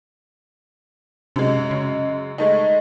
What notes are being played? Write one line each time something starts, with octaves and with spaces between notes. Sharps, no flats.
F#2 C3 G#3
C#3
G#3 A3 D#4